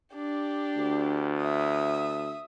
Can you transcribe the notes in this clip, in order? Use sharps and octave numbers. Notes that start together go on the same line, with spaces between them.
D4 G4
D2
E5 D#6